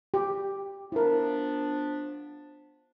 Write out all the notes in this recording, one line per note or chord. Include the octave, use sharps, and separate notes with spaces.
G4
F3 B3 D4 E4 A#4